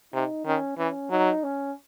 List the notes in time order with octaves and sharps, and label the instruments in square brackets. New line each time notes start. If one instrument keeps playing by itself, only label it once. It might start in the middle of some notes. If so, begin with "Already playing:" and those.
[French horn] C3 [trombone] D#4
[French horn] D#3 [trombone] C#4
[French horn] E3 [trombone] C#4
[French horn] F#3 [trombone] D#4
[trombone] C#4